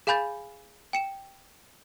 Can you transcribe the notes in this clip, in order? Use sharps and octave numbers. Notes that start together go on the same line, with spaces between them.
G#4 F5 G#5 B5 G6 A6
G5 C#7 E7